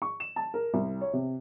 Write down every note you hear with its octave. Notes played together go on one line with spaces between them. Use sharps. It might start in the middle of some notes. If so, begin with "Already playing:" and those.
C#6
E7
A5
A#4
C2
C#5
C3